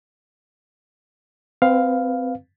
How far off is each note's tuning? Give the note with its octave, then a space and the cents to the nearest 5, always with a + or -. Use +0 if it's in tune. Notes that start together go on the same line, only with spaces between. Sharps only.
C4 -20 B4 +0 F5 +5